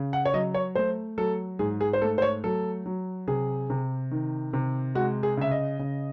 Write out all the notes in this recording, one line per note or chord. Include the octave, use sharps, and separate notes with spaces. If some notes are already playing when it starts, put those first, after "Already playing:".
Already playing: C#3
F#5
C#5
F#3 D#5
C#5
A3 C5
F#3 A4
G#2 G#4
G#4
C5
A3 A4
C5
C#5
F#3 A4
F#3
C3 G#4
C3
D#3
C3
G#3 F#4
G#4
C#3 E5
D#5
C#3